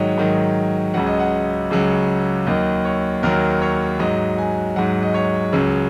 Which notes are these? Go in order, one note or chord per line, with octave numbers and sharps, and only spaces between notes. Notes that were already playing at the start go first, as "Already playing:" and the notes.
Already playing: G#2 D#3 F#3 C#5 D#5
G#2 D#3 F#3
C#2 C#3 F#3 F#5
D#5
F#5
C#2 C#3 F#3
D#2 D#3 F#3 D#5
C#5
D#2 D#3 F#3 A#4
C#5
G#2 F#3 D#5
G#5
G#2 F#3 F#5
D#5
C#5
C#2 C#3 F#3